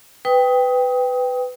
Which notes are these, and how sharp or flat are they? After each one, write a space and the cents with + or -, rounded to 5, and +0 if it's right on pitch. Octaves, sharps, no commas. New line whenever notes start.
B4 +15 G5 +10 D#6 +20